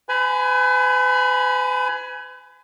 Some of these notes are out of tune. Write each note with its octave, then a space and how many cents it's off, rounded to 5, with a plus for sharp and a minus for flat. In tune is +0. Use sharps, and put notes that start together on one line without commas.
B4 +40 G#5 +10 B5 -15